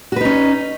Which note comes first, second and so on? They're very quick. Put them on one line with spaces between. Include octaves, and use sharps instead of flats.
F#4 B4 D#4 C#4